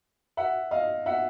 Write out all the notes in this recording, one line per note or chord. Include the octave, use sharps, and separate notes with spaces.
E5 F#5
D#5 F5
E5 F#5